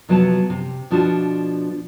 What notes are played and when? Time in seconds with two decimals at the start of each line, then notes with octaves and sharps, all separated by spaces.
0.09 C3 F3 F#3 B3 A5
0.50 C3
0.91 B2 F3 D4 F4 F#4